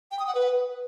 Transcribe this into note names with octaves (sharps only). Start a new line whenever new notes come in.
G5
D#6
F#5
B4